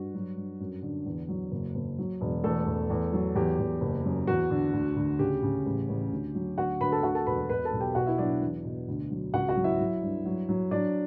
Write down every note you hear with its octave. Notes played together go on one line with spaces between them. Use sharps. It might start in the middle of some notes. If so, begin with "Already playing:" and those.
Already playing: G2 F#4
F#3
G2
F#2
D3
E2
F#3
F#1
F#1
F#3
E1
E2 A3 A4
E2
E2
F#3
E2 G4
E2
F#1
F#2
E2 F#4
D3
D2
D2
C#3 G4
C#3
A1
A1
D2
F#3
D2 F#4 F#5
D2 B4 B5
A4 A5
D2 F#4 F#5
A4 A5
E1 B4 B5
B2 B4 B5
A4 A5
B1
G4 G5
B2 F#4 F#5
E4 E5
F#3 D4 D5
E2
B2
D2
F#3
C#2 F#4 F#5
F#4 F#5
F#3
E4 E5
F#3
G2
F#3
F#3
F#3 D4 D5